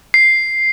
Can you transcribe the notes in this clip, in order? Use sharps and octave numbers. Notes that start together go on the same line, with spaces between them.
C7